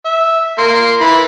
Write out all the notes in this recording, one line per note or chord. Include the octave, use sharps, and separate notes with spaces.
E5
A#3 C6
E3 B5